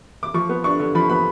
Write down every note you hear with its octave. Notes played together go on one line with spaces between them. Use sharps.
D6
F3 C#6
B3
D4 C#6
D3
F3 B5
B3 B5